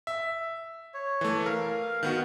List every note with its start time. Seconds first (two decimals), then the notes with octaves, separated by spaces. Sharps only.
0.07 E5
0.94 C#5
1.21 E3 A3
1.46 A#4 F5
2.03 D#3 B3 F#4